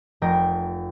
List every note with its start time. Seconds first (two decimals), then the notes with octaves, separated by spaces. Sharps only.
0.22 F1 A#4 G5 A#6